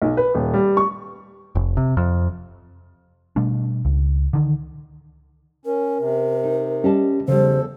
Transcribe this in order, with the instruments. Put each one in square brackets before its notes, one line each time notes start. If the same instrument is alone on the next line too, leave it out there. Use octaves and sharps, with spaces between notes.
[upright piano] B1
B4
D#1
G3
C#6
[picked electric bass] F1
C3
F2
B2 G3 A3 D4
C#2
D3 D#3
[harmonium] C#4 [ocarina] A#4
[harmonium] C3
[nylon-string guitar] D#4
[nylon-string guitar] G3 D#5 A5 [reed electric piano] C#4 G4
[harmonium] E2 A4 [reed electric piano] C#3 [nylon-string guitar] F3 G3 [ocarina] C5